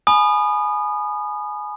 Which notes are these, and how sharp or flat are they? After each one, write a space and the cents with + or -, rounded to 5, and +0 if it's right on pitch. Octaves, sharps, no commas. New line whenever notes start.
G#5 +15 B5 +0 D#6 -25